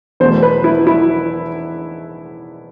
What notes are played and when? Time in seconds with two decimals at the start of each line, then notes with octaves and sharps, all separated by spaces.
0.20 E2 B2 A3 C5
0.43 B4
0.64 E4
0.87 E4